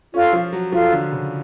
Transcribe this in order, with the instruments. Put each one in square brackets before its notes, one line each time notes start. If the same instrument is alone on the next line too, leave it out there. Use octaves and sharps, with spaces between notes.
[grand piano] C#4 [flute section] F4 A4 F5
[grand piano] F3
F#3
[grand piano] F3 [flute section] F4 A4 F5
[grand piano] D3
C#3